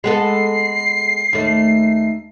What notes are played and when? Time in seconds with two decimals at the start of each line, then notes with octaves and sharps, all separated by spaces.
0.04 G#3 B3 A4 C7
1.33 D#2 A3